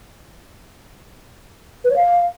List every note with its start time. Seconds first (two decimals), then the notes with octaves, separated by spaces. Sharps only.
1.84 B4
1.90 C#5
1.96 F5